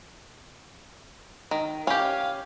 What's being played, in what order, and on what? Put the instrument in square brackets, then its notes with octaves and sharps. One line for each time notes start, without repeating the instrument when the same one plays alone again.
[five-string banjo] D#3
[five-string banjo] C#4 G4 [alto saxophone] F5